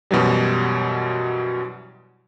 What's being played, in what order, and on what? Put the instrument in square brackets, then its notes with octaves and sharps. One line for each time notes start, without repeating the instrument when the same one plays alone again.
[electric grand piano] F#2 B2 E3 F#3 G3